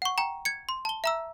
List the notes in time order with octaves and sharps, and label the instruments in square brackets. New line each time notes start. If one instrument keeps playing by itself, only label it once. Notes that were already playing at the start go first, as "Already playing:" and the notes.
[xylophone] F#5 C#6
G5 A#5
G#6 C#7
C6
A5 G7
E5 A#5 E6